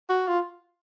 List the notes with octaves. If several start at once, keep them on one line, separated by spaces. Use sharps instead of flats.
F#4
F4